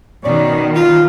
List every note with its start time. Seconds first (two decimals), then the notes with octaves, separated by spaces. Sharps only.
0.24 B2 D#3 C#4 C#5 D5
0.76 F4